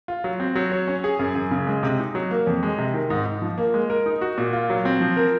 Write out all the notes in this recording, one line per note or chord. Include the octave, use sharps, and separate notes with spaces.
F4
F#3
C4
F#3
C#5
C#4
G#4
F#2
F#2
C#3
G#3
C3
D#4
F#3
A#3
F2
G#3
C3
D#3
G#2
G#2
F3
A#3
G#3
A#4
D#4
F#4
A#2
F4
F#3
C4
F3
A#4